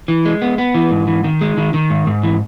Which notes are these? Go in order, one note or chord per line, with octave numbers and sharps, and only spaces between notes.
E3
G#3
B3
B3
E3
G#2
E3
D#3
G#3
D#3
D#3
G#2
G#2
E3